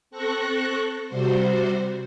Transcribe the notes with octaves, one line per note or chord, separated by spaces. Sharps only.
C4 A4 C#6 F#6 A#6
C3 G3 F#4 C5